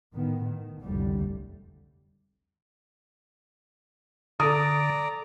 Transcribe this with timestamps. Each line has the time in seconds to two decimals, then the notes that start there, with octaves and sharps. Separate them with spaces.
0.14 A2 D#3 B3
0.45 D#3
0.81 F1 C2 F2 A2 D3 G3
4.40 D3 A4 D5 A#5 D#6